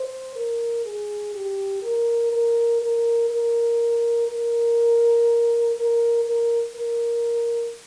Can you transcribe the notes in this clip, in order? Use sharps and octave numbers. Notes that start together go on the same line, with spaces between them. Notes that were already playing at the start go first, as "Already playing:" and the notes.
Already playing: C5
A#4
G#4
G4
A#4
A#4
A#4
A#4
A#4
A#4
A#4
A#4